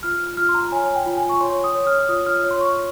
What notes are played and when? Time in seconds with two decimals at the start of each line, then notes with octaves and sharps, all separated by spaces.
0.03 F4 F6
0.37 F4 F6
0.49 C6
0.54 A#5
0.72 C#5 G#5
0.95 G5
1.06 F4
1.17 G#5
1.29 C#6
1.41 C#5 C6
1.64 D#6
1.75 C#5
1.87 F6
2.09 F4 D#6
2.26 F6
2.44 C#5
2.51 C6
2.61 C#6